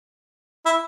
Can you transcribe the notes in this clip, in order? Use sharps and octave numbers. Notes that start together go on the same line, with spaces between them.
E4